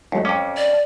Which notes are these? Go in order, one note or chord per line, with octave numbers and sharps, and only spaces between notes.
D#2 F#3 G#3 A3
F2 C#4 D6
D5